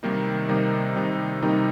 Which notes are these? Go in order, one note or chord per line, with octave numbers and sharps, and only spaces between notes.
C3 D#3 G3 A#3 D#4
C3 D#3 G3 A#3 D#4
C3 D#3 G3 A#3 D#4
C3 D#3 G3 A#3 D#4